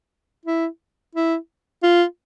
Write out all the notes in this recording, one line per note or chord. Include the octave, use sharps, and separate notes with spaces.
E4
E4
F4